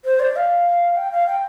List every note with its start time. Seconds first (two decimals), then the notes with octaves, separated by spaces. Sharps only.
0.05 C5
0.20 D5
0.36 F5
0.96 G5
1.11 F5
1.27 G5